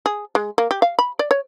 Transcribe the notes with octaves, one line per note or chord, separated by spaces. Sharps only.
G#4
G#3
A#3
G4
F5
B5
D5
C#5